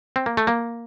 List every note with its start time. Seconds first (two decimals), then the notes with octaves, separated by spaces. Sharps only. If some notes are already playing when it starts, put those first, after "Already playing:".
0.16 C4
0.26 A#3
0.37 A3
0.47 A#3